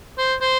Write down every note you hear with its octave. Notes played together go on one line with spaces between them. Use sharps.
C5
C5